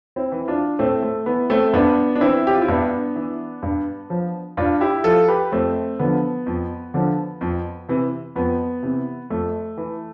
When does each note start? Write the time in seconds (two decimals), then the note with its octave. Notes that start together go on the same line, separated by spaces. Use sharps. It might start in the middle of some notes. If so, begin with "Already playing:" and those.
0.16 C4 E4
0.32 E3
0.48 D4 F4
0.79 A2 A3 C4
1.02 A3
1.26 E3 B3
1.50 A3 C4
1.73 G2 B3 D4
2.15 D4
2.21 E3 C4 E4
2.47 G4
2.54 F4
2.61 E4
2.68 G2 B3 D4
3.16 E3
3.63 G2
4.10 F3
4.57 G2 D4 F4
4.81 E4 G4
5.04 F3 F4 A4
5.28 G4 B4
5.52 F2 A3 C4
5.99 D3 F3 B3
6.46 F2
6.94 D3 F3
7.41 F2
7.89 C3 E3
8.36 F2 B3
8.83 C3 E3
9.30 F2 A3
9.77 E3